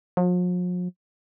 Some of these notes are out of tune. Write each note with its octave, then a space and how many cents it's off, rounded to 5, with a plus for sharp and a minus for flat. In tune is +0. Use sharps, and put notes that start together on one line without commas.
F3 +45